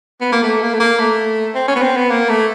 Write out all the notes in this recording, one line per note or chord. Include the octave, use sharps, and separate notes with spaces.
B3
A#3
A3
A#3
A3
A#3
A3
C4
C#4
B3
C4
B3
A#3
A3